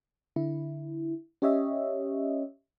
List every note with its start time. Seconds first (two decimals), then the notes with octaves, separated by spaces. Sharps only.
0.36 D3 E4
1.42 C#4 G4 C#5 D#5 E5